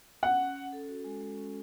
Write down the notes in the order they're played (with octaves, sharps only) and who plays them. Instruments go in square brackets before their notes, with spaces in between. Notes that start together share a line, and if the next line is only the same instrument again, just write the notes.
[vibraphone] C#4 [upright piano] F#5
[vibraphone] C#4
C#4
A4
F#4
G#3
G#3
C#4